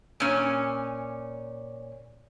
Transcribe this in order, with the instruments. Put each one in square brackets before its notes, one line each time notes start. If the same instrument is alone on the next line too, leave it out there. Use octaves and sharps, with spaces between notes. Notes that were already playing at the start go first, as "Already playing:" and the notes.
[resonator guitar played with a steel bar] A#2 C#4